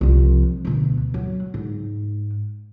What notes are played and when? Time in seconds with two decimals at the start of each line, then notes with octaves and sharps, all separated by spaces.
0.01 C2 F3
0.65 D2 B2
1.14 F#3
1.54 G#2